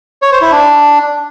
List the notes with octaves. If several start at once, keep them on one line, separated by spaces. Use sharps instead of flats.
C#5
C5
E4
D4